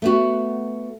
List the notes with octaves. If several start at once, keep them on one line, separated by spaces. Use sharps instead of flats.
A3 B3 F#4